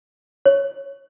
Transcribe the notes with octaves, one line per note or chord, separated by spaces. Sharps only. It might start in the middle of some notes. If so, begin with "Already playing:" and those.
C#5